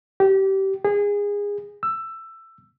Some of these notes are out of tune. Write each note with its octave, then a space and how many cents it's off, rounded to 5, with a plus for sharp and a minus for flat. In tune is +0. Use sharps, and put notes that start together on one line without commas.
G4 -25
G#4 -25
E6 +15